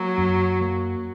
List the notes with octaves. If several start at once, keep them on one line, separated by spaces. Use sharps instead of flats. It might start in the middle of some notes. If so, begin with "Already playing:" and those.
Already playing: F#3 A#3
F#2
A#3